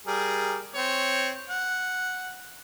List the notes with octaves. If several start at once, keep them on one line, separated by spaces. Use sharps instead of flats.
G3 G#4 A#4
C4 C#5
F#5